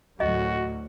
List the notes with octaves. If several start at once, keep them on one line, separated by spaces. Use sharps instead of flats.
D2 A2 F#3 F#4 D#5